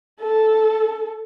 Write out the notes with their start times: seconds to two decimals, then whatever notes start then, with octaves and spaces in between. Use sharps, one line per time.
0.20 A4